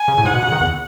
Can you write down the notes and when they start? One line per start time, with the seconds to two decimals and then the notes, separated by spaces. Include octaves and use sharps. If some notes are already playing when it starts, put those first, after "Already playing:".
Already playing: G#5
0.08 C#3
0.18 A2
0.25 G#2 F#5
0.34 B2
0.43 C#3
0.52 D#3
0.61 E2